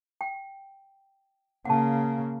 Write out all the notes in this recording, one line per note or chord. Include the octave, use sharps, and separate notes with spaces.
G5
C#3 A#3 F#5 A5